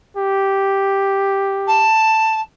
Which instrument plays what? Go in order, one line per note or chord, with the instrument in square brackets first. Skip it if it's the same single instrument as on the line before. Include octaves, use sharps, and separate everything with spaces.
[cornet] G4
[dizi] A5